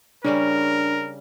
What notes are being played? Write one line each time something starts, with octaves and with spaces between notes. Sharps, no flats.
C#3 G3 C#4 D4 A#4